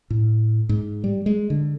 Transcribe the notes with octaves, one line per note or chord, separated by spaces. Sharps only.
A2
G#2
G3
G#3
D3